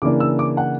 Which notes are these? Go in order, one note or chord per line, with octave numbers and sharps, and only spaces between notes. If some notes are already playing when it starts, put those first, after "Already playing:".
C#3 E3 A#3 D4 D6
E6
D6
F#5